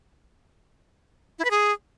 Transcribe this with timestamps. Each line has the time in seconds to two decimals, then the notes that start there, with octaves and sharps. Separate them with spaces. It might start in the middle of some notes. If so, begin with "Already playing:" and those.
1.39 E4
1.45 B4
1.51 G#4